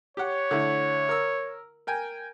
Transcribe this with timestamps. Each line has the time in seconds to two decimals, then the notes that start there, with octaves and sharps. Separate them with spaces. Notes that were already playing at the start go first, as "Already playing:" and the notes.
0.17 G4 C#5 F#5
0.51 D3 A3 E4
1.09 A#4 E6
1.87 A#4 G5 G#5